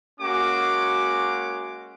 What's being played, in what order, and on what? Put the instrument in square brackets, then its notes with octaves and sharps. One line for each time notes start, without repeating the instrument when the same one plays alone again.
[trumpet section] G#3 A#3 C#4 F#4 D6